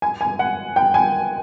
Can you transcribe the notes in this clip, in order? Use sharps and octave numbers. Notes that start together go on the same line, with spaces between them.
G#5
G#5
F#5
G5
G#5